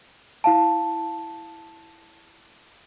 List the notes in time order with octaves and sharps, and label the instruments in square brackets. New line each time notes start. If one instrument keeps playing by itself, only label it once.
[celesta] E4 F5 A5